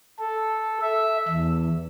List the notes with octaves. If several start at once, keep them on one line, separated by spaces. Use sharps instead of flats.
A4
E5
E2